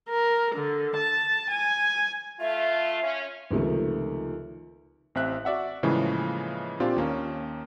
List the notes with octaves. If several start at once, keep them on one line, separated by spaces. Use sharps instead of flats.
A#4
D3
A5
G#5
A3 F4 E5
C#4
C#2 C3 D#3 F3 A3
A1 C4 E5 F#6
F#4 D5 E5 F#5
A2 C#3 E3 F3 G#3 A#3
A#2 C4 D4 F4 G4
D#2 A#3 C#4